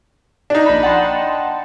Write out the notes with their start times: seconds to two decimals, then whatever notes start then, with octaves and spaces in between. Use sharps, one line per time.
0.50 D4 D#4 D5 D#5
0.66 A#1 B5
0.83 F#5 G5 A5 C6